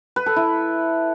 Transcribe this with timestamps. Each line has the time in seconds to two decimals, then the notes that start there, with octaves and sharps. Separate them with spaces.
0.16 B4
0.26 A4
0.36 E4